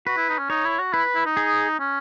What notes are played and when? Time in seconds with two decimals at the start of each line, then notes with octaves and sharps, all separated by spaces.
0.07 F#4 B4
0.17 E4
0.29 D#4
0.38 C#4
0.50 D#4 C#5
0.65 E4
0.79 F#4
0.93 E4 B4
1.15 E4
1.26 D#4
1.37 G#4
1.79 C#4